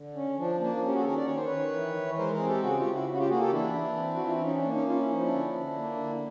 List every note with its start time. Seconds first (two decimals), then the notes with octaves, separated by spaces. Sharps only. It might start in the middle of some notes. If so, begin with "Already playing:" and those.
Already playing: D3
0.15 C#4
0.38 F3 D4
0.60 A#3 D4
0.82 C#4 G4
0.93 F#4 G#4
1.00 A4
1.05 D#3 G#4 A#4
1.16 D5
1.26 D#3 C#5
1.36 C5
1.45 D#3 B4 C#5
1.72 E3
1.95 E3
2.17 G#3 A#4 C5
2.32 G#4 A#4
2.39 C4
2.47 G4 A4
2.62 C#3 F#4 G#4
2.77 F4 G4
2.85 C#3
2.92 E4 F#4
3.07 C#3
3.12 F#4
3.18 F4 G4
3.29 A#3 F#4 G#4
3.40 G4 A4
3.52 E3 D4 E4
3.75 E3
3.97 C4
4.15 F#4
4.19 E3 F4
4.33 E4
4.42 C#4 D#4
4.57 D4
4.64 A#3
4.72 C#4 D#4
4.86 C#4 F4
4.98 E4
5.09 F3 D#4
5.21 D4 E4
5.32 D3
5.54 D3
5.77 A#3
5.99 D3